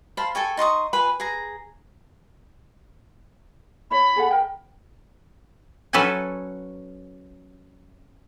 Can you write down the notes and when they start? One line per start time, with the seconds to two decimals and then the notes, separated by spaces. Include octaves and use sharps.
0.17 C5 F5 A5 B5
0.35 A4 G5 G#5 C#6
0.57 D#4 C6 C#6 D#6
0.93 F4 B4 G#5 B5
1.20 G#4 A#5
3.91 E4 C#5 B5
4.16 G#4 A4 F#5
4.31 A#4 G5
5.93 F#3 C#4 A4 B4 F#5 G#5